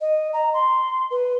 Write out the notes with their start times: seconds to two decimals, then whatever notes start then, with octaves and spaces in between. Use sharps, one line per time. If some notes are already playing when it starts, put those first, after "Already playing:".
0.01 D#5
0.33 A#5
0.54 C6
1.11 B4